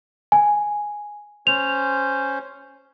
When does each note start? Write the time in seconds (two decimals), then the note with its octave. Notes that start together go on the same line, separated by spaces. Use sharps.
0.32 G#5
1.47 C#4 C5 F7